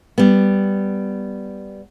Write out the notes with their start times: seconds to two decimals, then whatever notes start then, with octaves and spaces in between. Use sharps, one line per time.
0.18 G3 B3